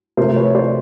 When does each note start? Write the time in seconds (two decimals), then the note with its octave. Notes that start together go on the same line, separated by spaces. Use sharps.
0.17 C3 F3 A3 A#4 C5
0.36 B4 C#5
0.55 C5 D5